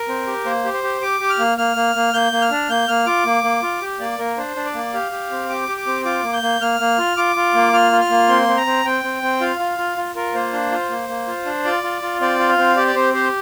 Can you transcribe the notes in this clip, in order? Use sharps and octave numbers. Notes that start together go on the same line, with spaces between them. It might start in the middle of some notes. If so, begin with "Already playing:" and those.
Already playing: A#4
C4
G4
A#3 C5
G4
C5
G4
G4 D6
G4
F6
A#3
A#3 F6
A#3
A#3
A#3 G6
A#3
F6
D4
A#3 G6
A#3 F6
F4 D6
A#3
A#3
F4
G4
A#3 D5
A#3 A#4
D4 C5
D4
D5
A#3
G4 F5
G4
C4
G4 D6
G4
D6
C4
F4 D6
A#3
G6
A#3
A#3 F6
A#3
F4
F4 D6
F4
A#3
F4 F6
F4
F6
A#3
C4 C6
C4
A#5
C4
C4 G5
C4
C4
F4 F5
F4
F4
F4
F4 A#4
A#3 C5
D4
F4
A#3
A#3
F4
D4
F4 D5
F4
F4
C4 D5
F4
F5
C4
G4 D5
D5
C4 C5
G4 C5